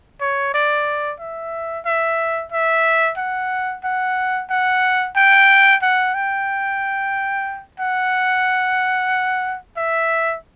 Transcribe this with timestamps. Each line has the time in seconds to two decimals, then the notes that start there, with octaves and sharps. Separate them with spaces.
0.21 C#5
0.54 D5
1.20 E5
1.85 E5
2.52 E5
3.17 F#5
3.84 F#5
4.50 F#5
5.16 G5
5.82 F#5
6.14 G5
7.79 F#5
9.77 E5